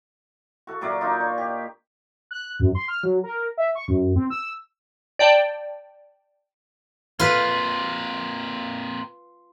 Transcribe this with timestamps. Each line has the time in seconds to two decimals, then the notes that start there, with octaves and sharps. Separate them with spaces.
0.67 F#4 A4
0.81 A#2 F#3 D5 E5
1.01 D4 D#4 F4
1.20 C#5
1.38 G4
2.31 F#6
2.60 F#2
2.75 C6
2.88 F6
3.03 F#3
3.24 A#4
3.58 E5
3.75 C#6
3.88 F#2
4.16 C4
4.30 E6
5.19 D5 G5 A5
7.20 A#3 C4 F4 B4